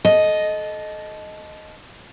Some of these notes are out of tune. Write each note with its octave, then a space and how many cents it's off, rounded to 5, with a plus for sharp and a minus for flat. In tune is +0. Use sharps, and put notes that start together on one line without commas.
A4 -20 D#5 +0